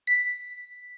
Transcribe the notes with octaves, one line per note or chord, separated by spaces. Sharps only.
B6